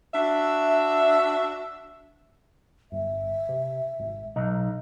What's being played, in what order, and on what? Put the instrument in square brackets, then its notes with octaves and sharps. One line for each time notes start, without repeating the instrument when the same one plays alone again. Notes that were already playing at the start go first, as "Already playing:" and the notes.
[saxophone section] D4 F#4 E5
[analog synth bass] G1 [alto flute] E5
[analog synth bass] C3
G#1
[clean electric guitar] B1 [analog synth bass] D#4